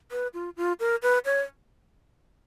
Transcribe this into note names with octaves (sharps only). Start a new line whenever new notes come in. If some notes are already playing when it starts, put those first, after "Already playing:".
B4
F4
F4
A#4
B4
C#5